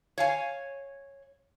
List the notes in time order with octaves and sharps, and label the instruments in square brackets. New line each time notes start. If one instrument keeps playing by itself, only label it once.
[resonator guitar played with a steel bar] C#5 F5 G#5